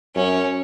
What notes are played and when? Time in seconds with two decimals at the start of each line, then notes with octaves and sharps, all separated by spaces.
0.15 F#2 C#4